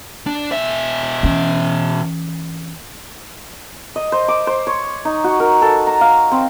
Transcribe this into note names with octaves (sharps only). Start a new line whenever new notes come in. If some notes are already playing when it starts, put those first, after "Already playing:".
D4
B2 E5
E3 C#4
D#5
C5
D6
C5
C#5
D#4
F#4
A#4
A4
A#5
F5
C4